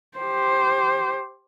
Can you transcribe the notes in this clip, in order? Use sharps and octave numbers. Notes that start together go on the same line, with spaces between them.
G4 C5